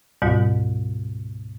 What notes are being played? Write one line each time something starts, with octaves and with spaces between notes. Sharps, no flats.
D2 G#2 B2 G3 F4